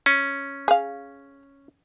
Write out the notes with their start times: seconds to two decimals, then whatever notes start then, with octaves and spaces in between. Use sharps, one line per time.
0.06 C#4
0.68 G#4 F5